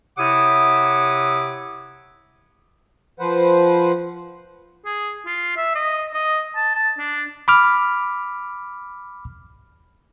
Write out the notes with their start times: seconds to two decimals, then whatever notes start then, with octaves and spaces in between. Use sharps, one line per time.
0.18 C3 E4 C#5 F#5 D6 D#6
3.20 F3 B4 C5 F#5
4.86 G#4
5.26 F4
5.57 E5
5.75 D#5
6.14 D#5
6.56 A5
6.75 A5
6.98 D4
7.48 B5 D6 F6